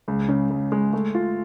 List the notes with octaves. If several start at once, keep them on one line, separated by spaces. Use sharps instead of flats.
C#2
C#3
C#2
G#3
A3
F4